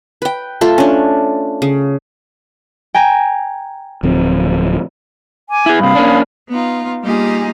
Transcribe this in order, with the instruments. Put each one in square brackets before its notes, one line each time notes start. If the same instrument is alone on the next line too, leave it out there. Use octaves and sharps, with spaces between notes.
[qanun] B4 G5
A3 F4 A4
C#4 D4
C#3
[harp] G5 G#5 A#5
[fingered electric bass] D1 F3 C4
[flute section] G#5 D6
[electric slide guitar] E4 G#4
[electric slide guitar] G2 C3 [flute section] F5 B5 D#6
[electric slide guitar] A#3 C#4 D4
[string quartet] B3 D#4 F4
G3 A#3 D#4 F4 G4 G#4